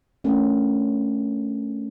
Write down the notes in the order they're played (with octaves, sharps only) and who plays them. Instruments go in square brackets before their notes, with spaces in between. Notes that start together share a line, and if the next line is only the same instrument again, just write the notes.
[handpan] A3 C#4 D4 A#4